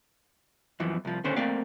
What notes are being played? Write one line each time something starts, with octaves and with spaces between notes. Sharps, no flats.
F#2 E3 F3
C2 F3
D#2 D3 C#4 C5
A3 A#3 C4 D5 F5